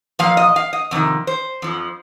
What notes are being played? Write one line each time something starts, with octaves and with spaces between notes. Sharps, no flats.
A#2 F3 F5
D#5
F5
D#5
F2 C3 D#3
C5
F2 F3